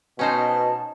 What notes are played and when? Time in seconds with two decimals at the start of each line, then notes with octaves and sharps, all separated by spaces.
0.19 B2 C#4 D#4 C5 A5